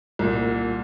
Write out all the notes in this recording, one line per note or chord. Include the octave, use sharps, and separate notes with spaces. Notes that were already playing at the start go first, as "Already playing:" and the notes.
C2 A#2